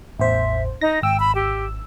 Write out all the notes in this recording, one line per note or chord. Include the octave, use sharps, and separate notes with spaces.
A1 E2 C5 E5
D#4 A#6
G#1 G5 E6
B5
G4